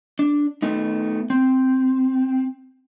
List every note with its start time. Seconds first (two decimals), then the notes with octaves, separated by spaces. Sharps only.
0.19 D4
0.62 A3 B3 D#4
1.30 C4